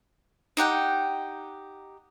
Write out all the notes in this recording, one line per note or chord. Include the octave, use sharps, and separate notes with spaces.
D#4 G4 F#5 G5